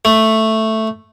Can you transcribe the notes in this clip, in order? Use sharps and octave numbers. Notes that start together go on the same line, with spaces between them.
A3